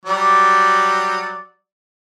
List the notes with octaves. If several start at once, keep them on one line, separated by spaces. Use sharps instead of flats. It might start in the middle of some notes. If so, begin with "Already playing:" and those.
F#3 G3 D5